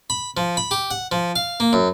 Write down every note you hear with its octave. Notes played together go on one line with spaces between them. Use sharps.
B5
F3
B5
G4
F#5
F3
F5
A#3
F#2